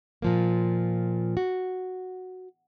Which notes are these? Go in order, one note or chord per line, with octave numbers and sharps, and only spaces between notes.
A#2 F3 A#3
F#4